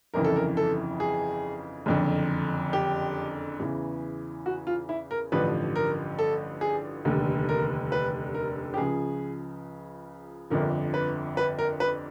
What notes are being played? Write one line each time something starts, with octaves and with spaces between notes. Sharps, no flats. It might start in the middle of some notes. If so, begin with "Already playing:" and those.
G1 F2 C#3 E3 A#4
A4
A#4
A4
G#4
F#1 F2 D3
G4
E2 C#3 E3
F#4
F4
E4
A#4
A1 G2 D3 F3 B4
A#4
A4
G#4
F1 D#2 D3
A#4
B4
A#4
G4
C#2 C#3 F3 G#4
G1 F2 D3 F3 A#4
B4
B4
A#4
B4